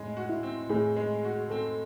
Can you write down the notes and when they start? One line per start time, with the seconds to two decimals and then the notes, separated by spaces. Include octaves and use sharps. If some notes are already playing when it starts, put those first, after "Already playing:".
Already playing: A2 G#3 C4
0.17 F#4
0.29 E4
0.43 C4
0.69 A2 G#4
0.97 G#3
1.25 F#4
1.50 C4 A4